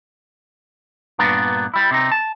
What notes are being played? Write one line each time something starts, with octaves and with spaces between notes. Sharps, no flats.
G2 A#2 A#3 B3 D4
G3 E4
C3 C4 D#4
A5